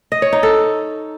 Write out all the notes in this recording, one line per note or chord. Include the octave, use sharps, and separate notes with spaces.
D#5
C#5
D#4
A4